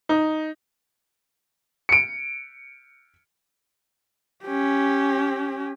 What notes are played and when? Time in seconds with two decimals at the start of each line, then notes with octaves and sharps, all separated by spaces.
0.09 D#4
1.89 C#7 D7
4.45 C#4 G4